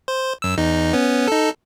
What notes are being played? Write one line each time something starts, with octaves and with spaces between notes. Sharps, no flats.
C5
F#2 E6
E2 D#4
B3 C#4
D#4 A4